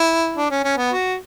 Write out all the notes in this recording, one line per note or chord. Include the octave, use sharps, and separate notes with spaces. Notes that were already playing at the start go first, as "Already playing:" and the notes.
Already playing: E4
D4
C#4
C#4
B3
F#4